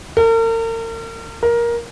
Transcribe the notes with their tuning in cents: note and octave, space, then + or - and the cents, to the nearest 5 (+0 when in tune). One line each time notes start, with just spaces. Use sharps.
A#4 -40
A#4 +15